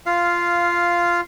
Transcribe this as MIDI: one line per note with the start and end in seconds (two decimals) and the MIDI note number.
0.06 1.21 65
0.06 1.21 77